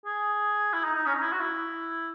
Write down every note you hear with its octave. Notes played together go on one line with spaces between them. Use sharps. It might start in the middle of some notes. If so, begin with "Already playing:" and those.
G#4
E4
D#4
D#4
C#4
D#4
E4
F#4
E4